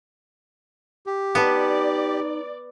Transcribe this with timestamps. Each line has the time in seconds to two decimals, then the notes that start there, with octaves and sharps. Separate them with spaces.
1.07 G4
1.35 B3 D#4 D5 A5